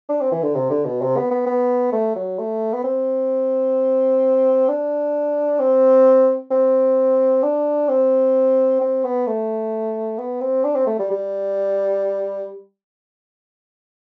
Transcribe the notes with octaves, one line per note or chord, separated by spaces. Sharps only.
D4
C4
E3
D3
C3
D3
B2
C3
B3
B3
B3
A3
F#3
A3
B3
C4
D4
C4
C4
D4
C4
C4
B3
A3
B3
C4
D4
C4
A3
G3
G3